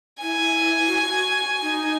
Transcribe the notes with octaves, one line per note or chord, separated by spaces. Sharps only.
E4 G#5
F#4
D#4